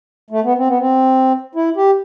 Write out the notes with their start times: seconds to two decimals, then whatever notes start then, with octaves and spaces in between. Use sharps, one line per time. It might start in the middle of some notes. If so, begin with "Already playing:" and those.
0.30 A3
0.44 B3
0.57 C4
0.68 B3
0.79 C4
1.55 E4
1.76 G4